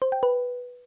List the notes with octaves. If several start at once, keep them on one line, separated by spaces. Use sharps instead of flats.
C5
G5
B4